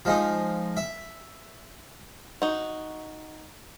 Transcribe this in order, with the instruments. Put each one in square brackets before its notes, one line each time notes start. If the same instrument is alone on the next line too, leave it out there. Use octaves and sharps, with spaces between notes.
[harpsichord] F3 G#3 D#4
E5
[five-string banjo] D#4 F#4